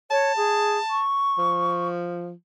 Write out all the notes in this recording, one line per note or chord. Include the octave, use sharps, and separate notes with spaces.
C#5 A5
G#4
C#6
F3